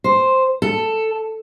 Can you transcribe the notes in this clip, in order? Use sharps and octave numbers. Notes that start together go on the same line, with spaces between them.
C5
A4